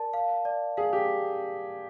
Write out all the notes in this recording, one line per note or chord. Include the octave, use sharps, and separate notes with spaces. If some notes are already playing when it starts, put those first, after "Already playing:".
Already playing: A#4 D5 A5
F5
D5
G#4 F5
G4